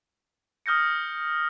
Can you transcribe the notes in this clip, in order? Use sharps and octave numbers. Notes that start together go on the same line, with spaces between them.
D#6 F6 G6 A#6 C#7